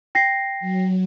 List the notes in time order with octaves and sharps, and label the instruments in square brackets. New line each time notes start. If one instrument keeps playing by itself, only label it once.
[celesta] G5 A#6 C7
[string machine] F#3